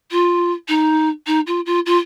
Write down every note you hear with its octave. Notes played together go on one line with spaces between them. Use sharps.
F4
D#4
D#4
F4
F4
F4